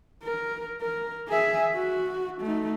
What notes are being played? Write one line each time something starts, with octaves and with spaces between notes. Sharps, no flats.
A#4
A#4
G#4 E5
F#4
A3 D#4